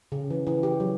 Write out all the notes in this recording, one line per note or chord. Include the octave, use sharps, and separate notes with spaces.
C#3
E3
E3
G4
F#3